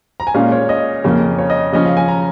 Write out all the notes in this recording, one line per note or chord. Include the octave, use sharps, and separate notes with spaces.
A#5
G#5
A#2 G#3 C#4 F5
C#5
D#5
F2 C#3 A#3 C#4
C#5
D#5
C#3 F3 C#4 D#5
F5
G#5
A#5